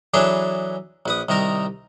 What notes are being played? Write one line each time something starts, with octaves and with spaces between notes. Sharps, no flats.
E3 F#3 D4 G#4 A4 B4
A#1 B4 D#6
C2 D#3 D#4 A#4